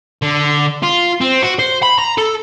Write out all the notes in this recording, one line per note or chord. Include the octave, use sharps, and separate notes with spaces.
D3
F4
C4
F#4
C5
B5
A#5
A4